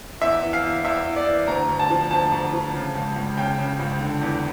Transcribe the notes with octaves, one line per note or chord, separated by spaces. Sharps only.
E2 E5
E3
F5
E2
E2 E5
E3
D5
E3
D2 A#5
D2
A5
F3
D2 A5
D2
F3
C#3
C#2
C#2
C#3 G5
C#3
C#2
D3
E2